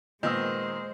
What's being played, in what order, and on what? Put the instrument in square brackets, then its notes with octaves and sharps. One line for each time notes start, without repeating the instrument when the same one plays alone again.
[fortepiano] A#2 B3 E6 [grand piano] D#3 [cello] G#3 C5 [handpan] D#5